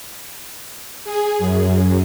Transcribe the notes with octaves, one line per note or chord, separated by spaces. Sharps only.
G#4
F#2